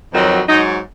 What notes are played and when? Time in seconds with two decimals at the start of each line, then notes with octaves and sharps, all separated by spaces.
0.12 F2 D#3 F#3
0.48 G#2 F#3 D#4